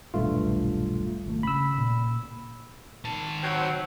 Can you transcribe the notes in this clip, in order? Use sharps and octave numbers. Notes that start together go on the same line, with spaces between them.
D#1 B1 G2 A3 F4
G#1 D3 A3
C#3 B5 E6
A#2
D#3 A5
F#3 C4